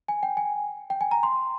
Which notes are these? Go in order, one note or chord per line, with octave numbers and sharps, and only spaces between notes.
G#5
G5
G#5
G5
G#5
A#5
C6